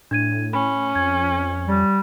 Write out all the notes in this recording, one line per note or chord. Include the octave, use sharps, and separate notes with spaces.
A2 D4 G#6 D#7
C#4 B5
F2 G#6
G3